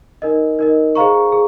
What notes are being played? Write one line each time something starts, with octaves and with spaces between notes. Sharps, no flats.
D#4 A#4 D#5
D#4 A#4 D#5
G#4 C5 F5 A#5 C#6
G#4